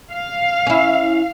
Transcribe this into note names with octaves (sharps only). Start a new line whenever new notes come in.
F5
C#4 E4